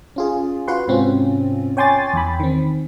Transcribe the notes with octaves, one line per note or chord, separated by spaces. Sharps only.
C#4 F4 G#4
F4 F#4 B4 F#5 C6
G#2 C3 C4 C#4 F4
C#5 G5 G#5 C6 D6 A6
E2 G5 B5
D#3 C4